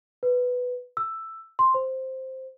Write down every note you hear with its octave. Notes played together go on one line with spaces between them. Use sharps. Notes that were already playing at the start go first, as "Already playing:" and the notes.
B4
E6
C6
C5